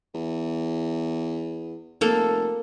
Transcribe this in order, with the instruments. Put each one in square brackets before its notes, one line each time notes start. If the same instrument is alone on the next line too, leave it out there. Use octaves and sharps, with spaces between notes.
[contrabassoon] E2
[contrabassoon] F1 [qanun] A#3 A4